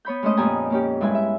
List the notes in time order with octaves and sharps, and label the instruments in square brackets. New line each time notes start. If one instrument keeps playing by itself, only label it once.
[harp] B3 C#5 B5 G6
G#3 A3 C#4 C5 D#5
F2 A#2 B3 G4 G#5 A#5
A#3 C#4 G4
G2 G#3 E4 B4 G#5
E5